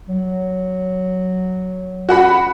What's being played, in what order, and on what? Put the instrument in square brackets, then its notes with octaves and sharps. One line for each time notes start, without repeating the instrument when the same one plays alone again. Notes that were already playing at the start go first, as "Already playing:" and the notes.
[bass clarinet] F#3
[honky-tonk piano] F#4 F#5 B5